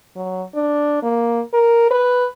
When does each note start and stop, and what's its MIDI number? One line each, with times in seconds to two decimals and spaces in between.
0.16 0.43 54
0.55 0.98 62
1.03 1.41 58
1.54 1.90 70
1.91 2.28 71